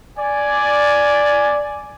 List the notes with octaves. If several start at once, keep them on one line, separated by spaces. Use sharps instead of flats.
D5 G#5